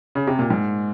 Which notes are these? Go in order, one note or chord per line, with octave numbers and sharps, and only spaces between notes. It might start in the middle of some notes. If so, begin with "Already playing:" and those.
C#3
C3
A#2
G#2